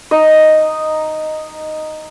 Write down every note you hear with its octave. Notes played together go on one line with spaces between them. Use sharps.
D#4 D#5